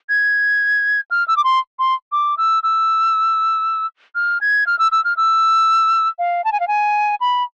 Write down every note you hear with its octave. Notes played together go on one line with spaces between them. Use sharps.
G#6
F6
E6
D6
C6
C6
D6
E6
E6
F6
G#6
F6
E6
E6
F6
E6
F5
A5
G#5
F5
G#5
B5